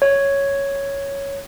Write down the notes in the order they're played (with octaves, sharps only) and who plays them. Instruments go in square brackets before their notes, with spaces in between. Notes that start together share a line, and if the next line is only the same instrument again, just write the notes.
[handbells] C#5